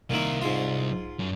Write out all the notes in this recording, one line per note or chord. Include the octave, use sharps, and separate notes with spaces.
C2 A#2 D#3 A#3 E5
G#2 F4
F#2